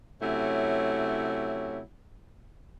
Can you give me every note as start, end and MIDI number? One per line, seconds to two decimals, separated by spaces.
0.21 1.81 48
0.21 1.81 54
0.21 1.81 57
0.21 1.81 61
0.21 1.81 64